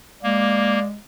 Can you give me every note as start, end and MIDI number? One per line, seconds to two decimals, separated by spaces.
0.23 0.97 56
0.23 0.79 58
0.23 0.87 74